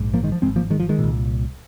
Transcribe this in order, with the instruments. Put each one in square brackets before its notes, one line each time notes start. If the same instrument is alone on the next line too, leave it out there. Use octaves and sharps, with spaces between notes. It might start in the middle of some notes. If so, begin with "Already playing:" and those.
Already playing: [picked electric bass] A#1 G#2
F3 A#3
D#3 G#3
F3
G#2 G#3 C4
G#1
F3 A#3
D#3 G#3
F3
D#3 G#3
C2 A#2